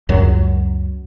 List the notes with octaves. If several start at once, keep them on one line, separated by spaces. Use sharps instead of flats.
C#2 F#2 F#3